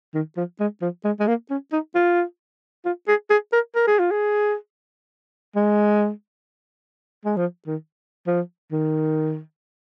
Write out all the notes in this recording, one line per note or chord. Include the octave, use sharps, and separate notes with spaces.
D#3
F3
G#3
F3
G#3
G#3
A#3
C#4
D#4
F4
F4
G#4
G#4
A#4
A#4
G#4
F4
G#4
G#3
G#3
F3
D#3
F3
D#3